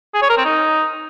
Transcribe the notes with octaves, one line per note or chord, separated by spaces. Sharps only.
G#4
C#5
A#4
C4
D#4